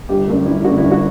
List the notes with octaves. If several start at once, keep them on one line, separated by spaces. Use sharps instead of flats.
G1 G4
F#2 D3 A3
G1 E4
F#2 D3 A3 F#4
E4
G1
F#4